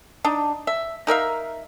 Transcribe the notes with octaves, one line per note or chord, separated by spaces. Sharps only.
D4 D#4
E5
D#4 A#4 E5 F5